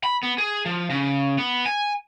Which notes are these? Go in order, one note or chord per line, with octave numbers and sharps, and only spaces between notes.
B5
B3
G#4
F3
C#3
B3
G#5